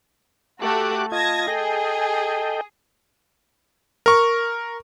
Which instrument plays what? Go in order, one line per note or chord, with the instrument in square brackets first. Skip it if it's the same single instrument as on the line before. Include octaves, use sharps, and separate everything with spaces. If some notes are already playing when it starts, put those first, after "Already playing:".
[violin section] A3 F#4 [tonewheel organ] G4 D6 F#6
[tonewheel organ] F4 D#5 [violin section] A5 G#6 A#6
[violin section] G#4 [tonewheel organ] A4 D#5 G5
[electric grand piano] A#4 C#6